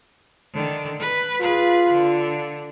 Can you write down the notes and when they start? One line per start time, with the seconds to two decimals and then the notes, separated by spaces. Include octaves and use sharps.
0.54 D3 D#3
0.99 B4
1.41 F4 G#4 B4
1.92 D3